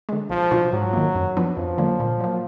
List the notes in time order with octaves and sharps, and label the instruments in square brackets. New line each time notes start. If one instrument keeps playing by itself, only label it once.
[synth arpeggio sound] D3 G#3
[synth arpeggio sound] B1 [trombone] F3
[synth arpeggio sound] B2 F#3 D4 F4
[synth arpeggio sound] G#2 [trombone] F#3
[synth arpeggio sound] D#3 A#3
F#2
F3 B3 D4
[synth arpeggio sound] F2 [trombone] F3
[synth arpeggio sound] D3 F#3 A#3
A#2
F#3 A#3